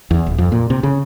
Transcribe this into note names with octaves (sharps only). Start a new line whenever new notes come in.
E2
D#1
F2
A#2
C3
C#3